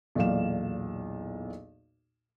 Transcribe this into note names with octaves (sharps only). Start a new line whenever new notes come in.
B1 E2 A#2 D5 F5 E7